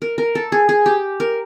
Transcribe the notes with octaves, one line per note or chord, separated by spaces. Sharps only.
A#4
A#4
A4
G#4
G#4
G4
A#4